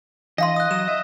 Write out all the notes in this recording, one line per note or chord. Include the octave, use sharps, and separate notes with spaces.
E3 D4 D#5 F5 C6 A#6
D#6 F#6
F#3 E7
E5